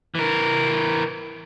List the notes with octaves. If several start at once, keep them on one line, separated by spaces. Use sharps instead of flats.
E3 A#4